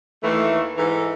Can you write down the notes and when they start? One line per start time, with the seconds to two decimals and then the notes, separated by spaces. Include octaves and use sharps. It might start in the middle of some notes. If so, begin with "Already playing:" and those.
0.24 D#2 E3 A3
0.77 G#2 E3 A4